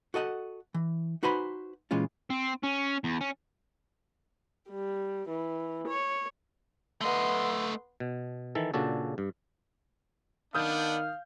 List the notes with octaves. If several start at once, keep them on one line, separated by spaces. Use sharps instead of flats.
F#4 A4 D#5 F#5
E3
D#4 F#4 B4 C5 G#5 B5
A#2 E3 G#3 C#4 F4
C4
C#4
E2
C#4
G3
E3
C#5
A3 B3 D#5 C6
B2
D#3 E3 A4
A#2 C#3 D4 F#4 A4
G2
D#3 B3 D4 F5 D#6 G6